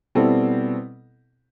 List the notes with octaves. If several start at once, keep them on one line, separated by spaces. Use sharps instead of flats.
B2 G3 C4 E4 A4